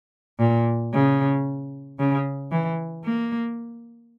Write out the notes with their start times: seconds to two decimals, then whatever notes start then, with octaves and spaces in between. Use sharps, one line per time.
0.40 A#2
0.93 C#3
1.99 C#3
2.52 E3
3.05 A#3